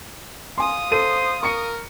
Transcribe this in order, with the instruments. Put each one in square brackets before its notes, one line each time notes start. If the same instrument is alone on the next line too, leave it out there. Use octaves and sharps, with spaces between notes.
[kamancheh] F5 D#6 [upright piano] G#5 C6
[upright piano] A4 D#7 [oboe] C5
[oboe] A#4 [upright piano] C#6 C#7